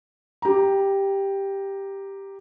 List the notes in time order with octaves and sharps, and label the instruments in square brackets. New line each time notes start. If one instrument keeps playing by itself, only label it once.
[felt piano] G4 A#5